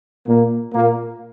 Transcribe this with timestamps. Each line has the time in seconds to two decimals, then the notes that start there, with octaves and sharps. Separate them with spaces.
0.27 A#2 A#3
0.74 A#2 A#3